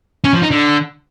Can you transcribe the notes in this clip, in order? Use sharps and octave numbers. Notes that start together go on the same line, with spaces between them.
C#4
F3
D#4
D3